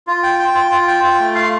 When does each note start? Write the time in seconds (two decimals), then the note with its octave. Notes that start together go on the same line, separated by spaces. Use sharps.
0.07 F4
0.23 G5
0.39 G5
0.55 F4
0.71 F4
0.88 G5
1.04 F4
1.19 A3
1.35 F5